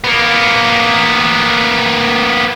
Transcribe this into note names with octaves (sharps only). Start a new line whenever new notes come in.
A#3 B3